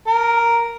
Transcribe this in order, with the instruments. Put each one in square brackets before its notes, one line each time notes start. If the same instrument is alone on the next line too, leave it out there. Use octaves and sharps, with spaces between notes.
[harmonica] A#4